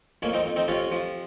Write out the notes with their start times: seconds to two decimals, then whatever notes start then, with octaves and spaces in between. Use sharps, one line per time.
0.22 F2 A#3 C#4
0.33 C4 D#4
0.46 F2
0.56 C4 D#4
0.68 C3 C#4 F4
0.92 F3